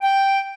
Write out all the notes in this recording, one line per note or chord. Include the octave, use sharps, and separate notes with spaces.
G5